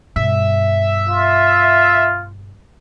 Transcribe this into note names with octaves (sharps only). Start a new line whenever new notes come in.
G2 B2 E5
F4